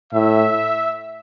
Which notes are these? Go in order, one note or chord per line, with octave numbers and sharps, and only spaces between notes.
A2 E5